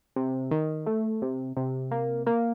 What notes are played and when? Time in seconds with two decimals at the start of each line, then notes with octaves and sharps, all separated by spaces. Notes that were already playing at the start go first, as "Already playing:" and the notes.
0.16 C3
0.51 D#3
0.86 A3
1.22 C3
1.57 C3
1.91 A#3
2.27 A#3